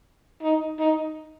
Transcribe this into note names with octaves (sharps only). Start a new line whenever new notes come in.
D#4
D#4